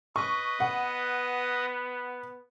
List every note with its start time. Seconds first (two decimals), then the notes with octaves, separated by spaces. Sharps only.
0.16 B4 D#5 C#6
0.60 B3 F#5